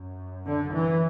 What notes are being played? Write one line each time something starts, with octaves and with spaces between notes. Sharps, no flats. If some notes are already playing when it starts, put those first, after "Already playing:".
Already playing: F#2
D3
E3